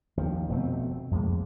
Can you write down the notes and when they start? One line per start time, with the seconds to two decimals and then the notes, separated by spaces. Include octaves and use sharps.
0.17 D#2 F3
0.49 F1 B2 A3 C4
1.11 F2 A2 G#3 A#3